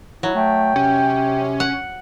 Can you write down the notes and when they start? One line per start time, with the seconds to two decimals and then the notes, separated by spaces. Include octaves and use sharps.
0.23 F#3 E4
0.35 A3 G5
0.76 C3 C#4
1.60 F#5